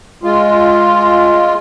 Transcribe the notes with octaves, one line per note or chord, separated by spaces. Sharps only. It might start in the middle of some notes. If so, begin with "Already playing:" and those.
G#3 F4